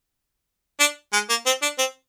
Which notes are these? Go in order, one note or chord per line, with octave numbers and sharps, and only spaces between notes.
D4
G#3
A#3
C4
D4
C4